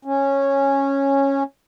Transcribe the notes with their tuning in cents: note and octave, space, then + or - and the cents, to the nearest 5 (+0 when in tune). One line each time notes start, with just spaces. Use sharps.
C#4 -10